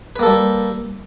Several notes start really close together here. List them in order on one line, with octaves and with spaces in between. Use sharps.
B4 A#3 A4 G3